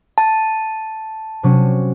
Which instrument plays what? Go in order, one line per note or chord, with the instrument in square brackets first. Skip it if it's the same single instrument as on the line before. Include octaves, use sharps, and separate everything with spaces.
[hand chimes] A5
[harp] C3 F#3 C#4